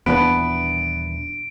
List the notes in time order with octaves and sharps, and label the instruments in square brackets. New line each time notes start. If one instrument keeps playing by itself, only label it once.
[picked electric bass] D#1 E3 D4 [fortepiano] B3 B4 [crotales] D7